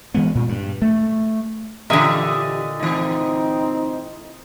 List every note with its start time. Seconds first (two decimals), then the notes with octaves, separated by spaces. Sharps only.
0.14 E3 G#3 A#3 B3
0.35 A#2
0.49 G2
0.82 A3
1.90 A#2 D3 E3 G4 D#5 E5
2.79 E3 A3 C4 D#4